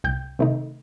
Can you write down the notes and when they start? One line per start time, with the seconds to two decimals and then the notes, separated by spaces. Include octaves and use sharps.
0.04 C2 G5 G6
0.39 C3 D#3 A3 D#4